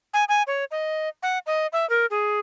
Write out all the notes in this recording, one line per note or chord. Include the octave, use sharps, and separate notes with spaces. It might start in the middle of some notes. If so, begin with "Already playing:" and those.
G#5
G#5
C#5
D#5
F#5
D#5
E5
A#4
G#4